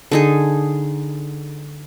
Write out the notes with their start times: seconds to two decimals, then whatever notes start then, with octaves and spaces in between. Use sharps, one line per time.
0.11 D3 D#4 G#4